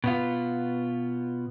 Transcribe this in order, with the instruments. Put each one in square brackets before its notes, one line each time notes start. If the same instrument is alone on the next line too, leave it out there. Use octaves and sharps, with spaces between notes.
[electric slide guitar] B2 B3 F4